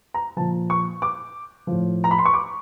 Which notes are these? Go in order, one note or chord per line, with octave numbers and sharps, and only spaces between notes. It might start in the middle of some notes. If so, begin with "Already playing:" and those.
A#5
A#2 F3 A5
C#6
D6
A2 F3
A#5
B5
C6
C#6
D6